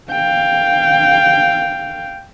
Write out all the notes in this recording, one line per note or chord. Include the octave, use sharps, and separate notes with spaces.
F5 G5